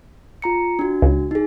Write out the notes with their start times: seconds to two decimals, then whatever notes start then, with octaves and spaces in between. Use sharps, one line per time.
0.42 F4 A#5 C#7
0.79 D4 F#4
1.02 C#2
1.31 D#4 G#4